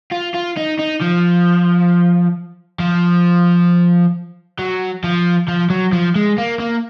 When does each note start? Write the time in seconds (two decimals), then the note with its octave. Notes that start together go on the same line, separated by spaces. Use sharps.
0.11 F4
0.34 F4
0.57 D#4
0.79 D#4
1.01 F3
2.80 F3
4.59 F#3
5.04 F3
5.48 F3
5.70 F#3
5.92 F3
6.16 G#3
6.38 A#3
6.59 A#3